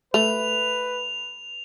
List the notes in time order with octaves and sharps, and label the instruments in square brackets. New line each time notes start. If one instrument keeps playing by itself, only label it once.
[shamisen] A3 [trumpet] B4 [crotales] F7